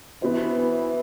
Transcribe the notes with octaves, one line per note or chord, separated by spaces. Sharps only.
E3 B3 F#4 C5